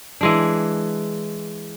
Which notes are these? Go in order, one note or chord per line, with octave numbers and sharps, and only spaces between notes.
E3 G#3 D4